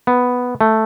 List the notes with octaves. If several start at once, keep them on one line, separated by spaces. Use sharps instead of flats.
B3
A3